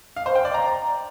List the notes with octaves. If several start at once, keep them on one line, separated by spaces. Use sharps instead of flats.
F5
C5
G5
D5
A#5